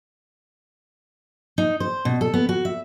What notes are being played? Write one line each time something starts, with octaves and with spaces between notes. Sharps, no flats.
D#4
C5
B2
A4
B3
F#4
E5